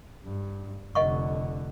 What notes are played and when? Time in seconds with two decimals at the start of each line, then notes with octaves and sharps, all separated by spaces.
0.24 G2
0.95 F1 D3 D#5 F#5 C#6